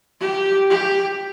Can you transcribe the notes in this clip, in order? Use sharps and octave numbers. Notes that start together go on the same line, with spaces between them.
G4
G4